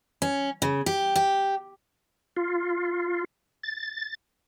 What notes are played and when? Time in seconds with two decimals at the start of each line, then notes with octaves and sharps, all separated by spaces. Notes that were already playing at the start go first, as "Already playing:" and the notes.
0.22 C#4
0.62 C#3
0.86 G4
1.16 G4
2.37 F4
3.63 A6